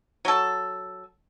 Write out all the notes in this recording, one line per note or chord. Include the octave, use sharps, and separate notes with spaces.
F#3 A4